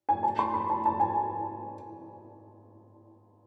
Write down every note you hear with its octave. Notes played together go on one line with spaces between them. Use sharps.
G#5
A5
C6
B5
A5
A5
G#5